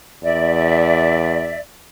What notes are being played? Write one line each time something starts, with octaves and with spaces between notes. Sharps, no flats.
E2 D5 E5